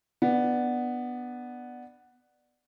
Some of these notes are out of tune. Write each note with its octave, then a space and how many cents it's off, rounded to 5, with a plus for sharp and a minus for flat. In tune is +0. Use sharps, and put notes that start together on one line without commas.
B3 +0 D4 +15